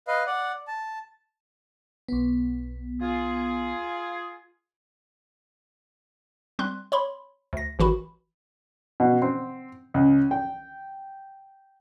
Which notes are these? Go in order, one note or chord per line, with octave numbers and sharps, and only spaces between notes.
B4 D#5 F5
D5 F#5
A5
B1 B3
F4 G#4
G3 C4 C6 F#6
C#5 B5 C6
D2 A#6
G#1 E3 F#4 B5
B2
C4
C#2
G5